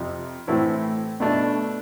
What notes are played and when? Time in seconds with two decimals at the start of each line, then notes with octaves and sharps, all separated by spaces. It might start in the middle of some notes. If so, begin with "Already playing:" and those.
Already playing: F2 C3 F3
0.47 A2 E3 A3 C4 E4
1.20 B2 A3 D4